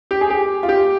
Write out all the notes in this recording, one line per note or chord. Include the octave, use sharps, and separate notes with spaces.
G4
G#4
G4
F4
G4